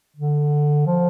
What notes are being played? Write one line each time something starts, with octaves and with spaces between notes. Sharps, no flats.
D3
F3